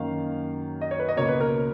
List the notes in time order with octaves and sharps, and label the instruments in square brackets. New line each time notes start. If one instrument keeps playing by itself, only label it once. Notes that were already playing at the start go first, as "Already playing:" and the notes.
Already playing: [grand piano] F#2 D#3 A#3 F5
D#5
C#5
B4
D#5
C#2 B2 A#3 C#5
B4
A#4